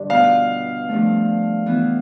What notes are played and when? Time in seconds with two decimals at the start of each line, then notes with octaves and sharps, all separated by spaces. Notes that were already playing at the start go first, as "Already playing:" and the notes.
Already playing: G2 D3 D4
0.10 B2 B3 F4 F5
0.89 G2 F3 A3
1.66 E3 B3 E4